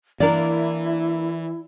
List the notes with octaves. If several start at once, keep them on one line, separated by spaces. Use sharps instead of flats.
E3 A#3 D4 E4 A#4 D5